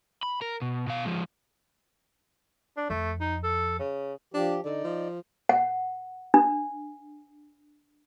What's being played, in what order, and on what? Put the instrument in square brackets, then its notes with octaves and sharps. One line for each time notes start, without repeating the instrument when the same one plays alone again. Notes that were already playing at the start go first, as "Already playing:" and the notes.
[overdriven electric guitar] B5
A#4
B2
B2 F5
F3 G#3
[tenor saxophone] D4
[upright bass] F2 [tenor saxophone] A3
[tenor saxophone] D#4
A4
C#3
[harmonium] F3 G4 [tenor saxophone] D4
[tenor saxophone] D3 [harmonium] D#4 D5
[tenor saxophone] F3
[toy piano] F#5
D4